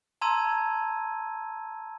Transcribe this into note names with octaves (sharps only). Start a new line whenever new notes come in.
A5 A#5 C6 E6 G#6 D#7